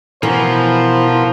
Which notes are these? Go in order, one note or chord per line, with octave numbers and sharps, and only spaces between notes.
B2 E3 F3 A#4 C5